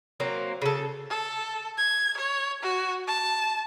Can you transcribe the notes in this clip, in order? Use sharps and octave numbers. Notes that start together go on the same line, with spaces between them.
F#3 A#3 C4
C#3 A4
A4
G#6
C#5
F#4
A5